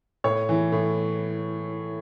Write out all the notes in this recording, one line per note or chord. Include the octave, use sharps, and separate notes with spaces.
A2 C#5 C#6
E3
A2